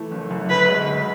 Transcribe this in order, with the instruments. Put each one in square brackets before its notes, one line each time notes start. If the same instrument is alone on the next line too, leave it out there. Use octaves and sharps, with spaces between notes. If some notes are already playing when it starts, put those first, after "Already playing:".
Already playing: [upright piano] E3 A3
F#1
F#2
[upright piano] D2 [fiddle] B4
[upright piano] G#3
D2